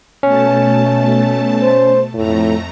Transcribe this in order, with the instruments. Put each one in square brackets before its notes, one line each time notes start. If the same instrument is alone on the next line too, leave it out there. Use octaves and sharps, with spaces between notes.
[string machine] B2 A3 A5 [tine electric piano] C#4
[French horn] C5
[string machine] F2 A3 A#5 [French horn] A2